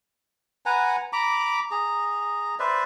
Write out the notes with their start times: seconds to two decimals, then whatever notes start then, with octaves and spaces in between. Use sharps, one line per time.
0.66 B4 F#5 G#5 A#5
1.13 A#5 B5 D6
1.71 G#4 A#5
2.59 B4 C5 D5 E5